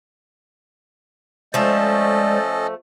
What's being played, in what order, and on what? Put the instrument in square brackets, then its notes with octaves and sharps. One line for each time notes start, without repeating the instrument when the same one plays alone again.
[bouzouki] F3 A3 [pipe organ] G#3 C5 D5 [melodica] C#4 A4 D#5